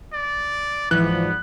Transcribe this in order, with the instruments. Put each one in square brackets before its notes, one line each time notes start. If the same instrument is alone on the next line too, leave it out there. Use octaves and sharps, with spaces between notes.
[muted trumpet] D5
[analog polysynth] G#2 F3 D5 [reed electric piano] E3 [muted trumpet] B3 [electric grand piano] F#6